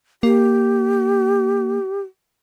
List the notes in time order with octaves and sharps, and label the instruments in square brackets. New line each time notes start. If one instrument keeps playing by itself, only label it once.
[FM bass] A#3 [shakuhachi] G4